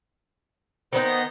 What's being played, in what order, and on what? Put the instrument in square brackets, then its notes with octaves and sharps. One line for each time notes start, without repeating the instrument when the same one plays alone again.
[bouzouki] D#3 B3 D#4 [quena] C5